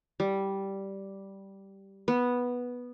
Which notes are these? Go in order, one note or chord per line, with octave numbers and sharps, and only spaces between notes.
G3
B3